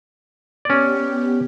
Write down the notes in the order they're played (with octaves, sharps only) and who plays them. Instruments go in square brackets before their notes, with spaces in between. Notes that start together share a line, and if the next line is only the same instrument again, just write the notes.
[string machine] B3 G4 [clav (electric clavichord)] C#4 D5